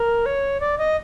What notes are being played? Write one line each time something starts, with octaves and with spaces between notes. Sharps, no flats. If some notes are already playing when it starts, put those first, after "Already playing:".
Already playing: A#4
C#5
D5
D#5